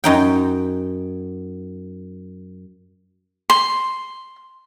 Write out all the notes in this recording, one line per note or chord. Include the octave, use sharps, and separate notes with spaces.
F#2 D#4 G5
C6